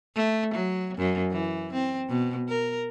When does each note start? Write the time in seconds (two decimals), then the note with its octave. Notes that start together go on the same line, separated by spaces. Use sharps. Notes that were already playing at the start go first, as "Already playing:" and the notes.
0.16 A3
0.54 F#3
0.97 F#2
1.31 E3
1.73 C4
2.09 B2
2.49 A#4